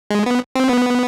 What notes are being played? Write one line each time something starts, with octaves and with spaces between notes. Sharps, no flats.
G#3
B3
C4
B3